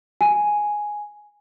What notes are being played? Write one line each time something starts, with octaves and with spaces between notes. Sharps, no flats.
G#5